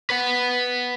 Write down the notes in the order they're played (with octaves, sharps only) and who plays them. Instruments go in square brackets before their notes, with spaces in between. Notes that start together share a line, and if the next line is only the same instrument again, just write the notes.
[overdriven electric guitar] B4 F#5